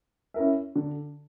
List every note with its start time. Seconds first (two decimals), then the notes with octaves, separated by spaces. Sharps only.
0.34 C#4 E4 A#4 E5
0.75 D3